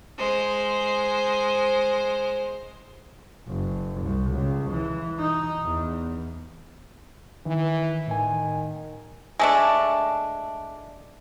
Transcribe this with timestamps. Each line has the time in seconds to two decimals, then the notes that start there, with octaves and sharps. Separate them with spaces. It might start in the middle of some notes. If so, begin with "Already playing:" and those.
0.19 G#3 C5
3.48 F#1
4.02 C2
4.31 C#2
4.71 E3
5.19 D#4
5.63 E2
7.46 D#3 E3
8.08 A2 D#3 G#5
9.39 G#3 A3 D4